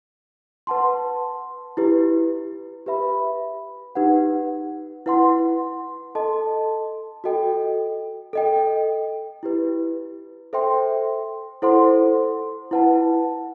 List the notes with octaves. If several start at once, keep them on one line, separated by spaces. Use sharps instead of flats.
B4 F#5 A5 C6
E4 G4 B4
G4 B4 E5 B5
D#4 G4 B4 F#5
E4 B4 F#5 C6
A4 D#5 A5 C6
F#4 A4 D#5 G5
A4 D#5 G5
E4 G4 B4
A4 C5 E5 G5 C6
E4 A4 C5 F#5 C6
E4 B4 F#5 A5